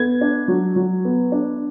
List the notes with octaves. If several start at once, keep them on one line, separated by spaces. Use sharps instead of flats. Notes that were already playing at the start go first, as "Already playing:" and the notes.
Already playing: B3 G#6
D4
F#3
F#3
B3
D4